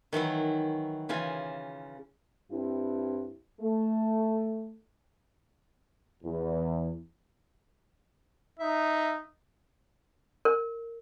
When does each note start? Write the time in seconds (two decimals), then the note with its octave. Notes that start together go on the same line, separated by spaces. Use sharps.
0.13 D#3 E3 F#3 E4
1.09 C#3 E3 F4 G#5
2.52 G2 C4 E4
3.61 A3
6.24 E2
8.59 D#4 E5
10.45 A#4